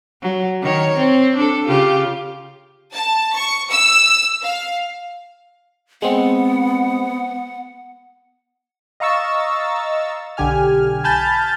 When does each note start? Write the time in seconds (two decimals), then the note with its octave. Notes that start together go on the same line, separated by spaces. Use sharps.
0.22 F#3
0.62 D#3 C#5
0.97 C4
1.37 D4 A4
1.67 C#3 F4 G4
2.93 A5
3.35 C#6
3.71 E6
4.42 F5
6.02 G#3 B3 C4 F#5
9.00 D#5 F5 A#5 C#6 E6 A6
10.37 B1 D3 G4 G#5 F6
11.04 G#5 A5 B5 F6 G6 A6